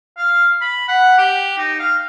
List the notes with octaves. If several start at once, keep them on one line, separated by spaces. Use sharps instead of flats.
F5
B5
F#5
G4
D#4
F5